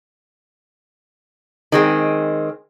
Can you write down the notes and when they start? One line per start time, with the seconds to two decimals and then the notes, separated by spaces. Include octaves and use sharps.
1.72 D#3 G#3 C4